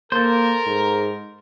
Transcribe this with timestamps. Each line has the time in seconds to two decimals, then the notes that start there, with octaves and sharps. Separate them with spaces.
0.12 A#3 A4 A#4 C5
0.66 G#2